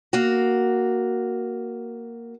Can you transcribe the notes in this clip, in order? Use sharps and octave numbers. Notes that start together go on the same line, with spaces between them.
A#3 F#4